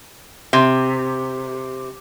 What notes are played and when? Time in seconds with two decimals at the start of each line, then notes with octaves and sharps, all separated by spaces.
0.53 C3